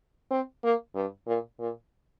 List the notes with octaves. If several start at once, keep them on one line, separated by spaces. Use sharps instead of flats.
C4
A#3
G2
A#2
A#2